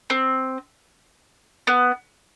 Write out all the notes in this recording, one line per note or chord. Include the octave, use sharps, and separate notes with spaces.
C4
B3